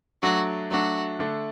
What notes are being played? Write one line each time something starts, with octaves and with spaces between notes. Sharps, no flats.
F#3 A3 D4 F#4
F#3 A3 D4 F#4
D3 A3 D4